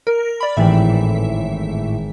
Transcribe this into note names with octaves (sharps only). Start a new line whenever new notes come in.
A#4
D5 B5
G#1 A2 E3 E5